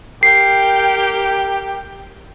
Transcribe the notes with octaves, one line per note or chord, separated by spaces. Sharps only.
G4 A#4 G5 C7